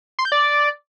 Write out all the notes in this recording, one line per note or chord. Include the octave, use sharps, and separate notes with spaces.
C6
G6
D5